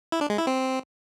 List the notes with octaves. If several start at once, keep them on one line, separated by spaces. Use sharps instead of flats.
E4
D4
G#3
E4
C4